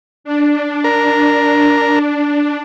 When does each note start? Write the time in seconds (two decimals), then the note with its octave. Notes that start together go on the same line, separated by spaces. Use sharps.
0.24 D4
0.84 A#4